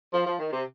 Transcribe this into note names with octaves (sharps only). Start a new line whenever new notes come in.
F3
F3
D#3
C3